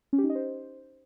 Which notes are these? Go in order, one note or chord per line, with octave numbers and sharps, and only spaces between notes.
C#4
G4
D#4
D#5
C5